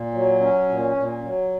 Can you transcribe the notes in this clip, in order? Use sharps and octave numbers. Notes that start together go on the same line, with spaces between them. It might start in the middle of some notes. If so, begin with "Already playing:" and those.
Already playing: A#2
F#3
C#4
A#2
A#2
F#3